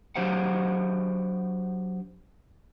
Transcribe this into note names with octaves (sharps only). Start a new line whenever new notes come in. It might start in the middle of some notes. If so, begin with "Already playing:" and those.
F#3 D4 G4 C5 F5 F#5